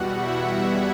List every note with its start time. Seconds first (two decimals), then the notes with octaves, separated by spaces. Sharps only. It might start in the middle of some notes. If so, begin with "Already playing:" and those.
Already playing: E2 B2 G3 F#4 F#5
0.08 E4 E5